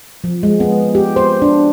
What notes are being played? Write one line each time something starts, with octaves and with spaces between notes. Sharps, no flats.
F3
G#3
B3
G4
C5
D4